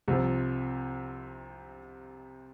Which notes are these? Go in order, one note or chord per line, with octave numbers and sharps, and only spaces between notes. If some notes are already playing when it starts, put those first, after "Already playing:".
C2 C3 F3